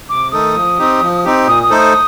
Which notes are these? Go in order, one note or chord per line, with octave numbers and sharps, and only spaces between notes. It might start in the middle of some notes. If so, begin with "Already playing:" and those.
C3 D6
D#3 A3 D#4 A4 D#6
F3
C4 D#4 G4
F3
C4 D#4 G4
A#2 D#6
D#6
A3 D#4 A4 C5
D#6